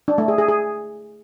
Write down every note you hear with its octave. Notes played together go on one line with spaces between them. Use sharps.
D4
A3
G#4
G#4
G#4